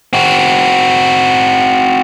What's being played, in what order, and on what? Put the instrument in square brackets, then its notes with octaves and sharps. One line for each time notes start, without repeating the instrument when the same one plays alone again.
[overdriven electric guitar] C4 F#4